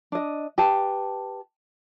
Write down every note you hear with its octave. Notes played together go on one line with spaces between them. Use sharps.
D4 D#5
G4 B4 A5